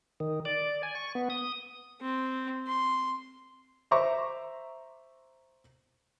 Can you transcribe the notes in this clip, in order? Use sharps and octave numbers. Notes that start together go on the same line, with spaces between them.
D#3
D5
G#5
C#6
B3
D#6
C4
C6
C5 E5 A#5 C#6 D6